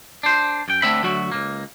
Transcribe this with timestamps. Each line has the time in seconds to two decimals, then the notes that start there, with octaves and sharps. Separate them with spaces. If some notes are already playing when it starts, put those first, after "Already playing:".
0.23 D4 C5
0.68 F#2 G5
0.82 D3 A3 C4 E5 B5
1.03 D2 F#3 F#4 E5
1.32 C#2 A#3